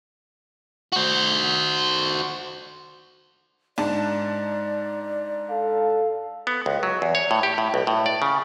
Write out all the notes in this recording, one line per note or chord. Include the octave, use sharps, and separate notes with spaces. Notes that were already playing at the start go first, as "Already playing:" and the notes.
F#4 C5
G#2 D4 D5 A5
A4 F5
B3
C#2
F#3
E2
C#5
A2
G4
A2
B1
A2
D5
C#3